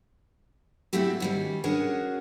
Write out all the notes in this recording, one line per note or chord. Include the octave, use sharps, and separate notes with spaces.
A3 C4 E4 F#4 G4 A4
D#3 G3 C#4
C#4 D4 F#4 G#4 A#4 C#5